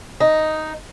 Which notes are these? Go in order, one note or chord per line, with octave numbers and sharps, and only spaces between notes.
D#4